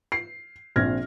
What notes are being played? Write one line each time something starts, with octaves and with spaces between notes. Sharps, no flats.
C7
A#1 C4 F6 G#6 A#6